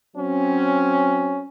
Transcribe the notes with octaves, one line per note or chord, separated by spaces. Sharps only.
F#3 C4 C#4